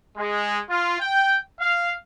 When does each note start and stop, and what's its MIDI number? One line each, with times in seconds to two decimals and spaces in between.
0.17 0.61 56
0.70 1.00 65
1.00 1.38 79
1.60 1.93 77